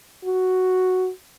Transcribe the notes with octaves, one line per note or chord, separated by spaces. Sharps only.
F#4